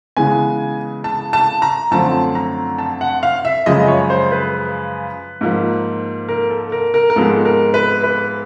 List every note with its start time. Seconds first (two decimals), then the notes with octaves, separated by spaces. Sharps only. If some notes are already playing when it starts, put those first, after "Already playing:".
0.17 C#3 E3 G#3 B3 G#5
1.04 A5
1.33 A5
1.62 A#5
1.91 F#2 D3 F3 A3 C4 A5
2.35 A#5
2.78 A5
3.01 F#5
3.23 F5
3.45 E5
3.66 F#2 C#3 F3 G#3 D#5
3.88 C#5
4.10 C5
4.32 B4
5.41 G#2 F3 A#3
6.29 A#4
6.50 A4
6.72 A#4
6.94 A#4
7.10 A#4
7.16 G#2 F3 G#3 B3 A4
7.45 A#4
7.74 B4
8.03 B4